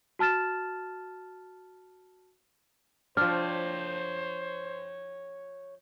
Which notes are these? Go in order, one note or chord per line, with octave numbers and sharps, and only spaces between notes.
F#4 A5 F6 A6 E7
F3 D4 C5 C#5 G5 F6